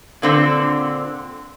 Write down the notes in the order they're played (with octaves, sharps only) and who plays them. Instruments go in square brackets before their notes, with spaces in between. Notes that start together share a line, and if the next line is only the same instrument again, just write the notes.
[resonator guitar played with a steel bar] A#2 D3 C4